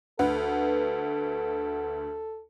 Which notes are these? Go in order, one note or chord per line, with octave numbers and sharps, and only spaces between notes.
D2 A4 B4 F#5